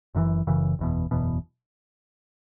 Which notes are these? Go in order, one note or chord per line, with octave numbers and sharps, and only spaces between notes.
F#1 F#2 C#3 E3
F#1 F#2 C#3 E3
F#1 E2 B2
F#1 E2 B2